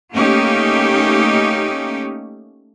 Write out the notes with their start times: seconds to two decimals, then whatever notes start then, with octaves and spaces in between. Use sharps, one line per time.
0.12 A3 A#3 C#4 D#4 G4